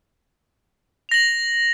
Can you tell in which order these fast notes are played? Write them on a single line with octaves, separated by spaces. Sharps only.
F7 A#6 F#7